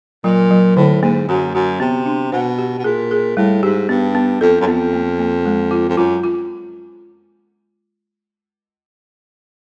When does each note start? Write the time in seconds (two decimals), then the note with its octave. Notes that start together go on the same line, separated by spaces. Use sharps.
0.24 A#2 F#3
0.51 F#3
0.76 A2 D3
1.02 G#2 A#3
1.28 F#2 F#4
1.55 F#2 F#4
1.80 C3 B3
2.06 D4
2.32 B2 C5
2.59 G4
2.79 B2
2.84 A#2 G#4
3.11 G#4
3.37 A2 G3
3.63 G#2 G4
3.89 G2 B3
4.15 B3
4.41 F2 A4
4.60 F#2
4.67 F2 B3
4.93 A#3
5.19 A#3
5.45 G#3
5.71 F4
5.89 F2
5.97 F#2 F4
6.24 F4